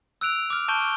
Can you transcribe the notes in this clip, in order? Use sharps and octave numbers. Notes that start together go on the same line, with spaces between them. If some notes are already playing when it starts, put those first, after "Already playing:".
E6 F#6 D7 F7
D6 F6
A5 C#6 G6 D7 G7